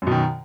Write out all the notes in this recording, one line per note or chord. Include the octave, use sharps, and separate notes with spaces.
F#2 B2 D#3